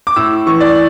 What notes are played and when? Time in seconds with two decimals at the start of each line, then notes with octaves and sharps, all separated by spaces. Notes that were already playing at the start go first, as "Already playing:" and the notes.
0.07 D6
0.16 A2 E6
0.46 E3 C#6
0.61 D5